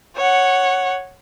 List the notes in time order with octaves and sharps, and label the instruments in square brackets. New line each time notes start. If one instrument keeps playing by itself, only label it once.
[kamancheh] C#5 F#5